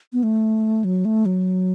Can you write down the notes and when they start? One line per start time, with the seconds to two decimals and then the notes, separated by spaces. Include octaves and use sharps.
0.13 B3
0.23 A3
0.84 F#3
1.05 A3
1.26 F#3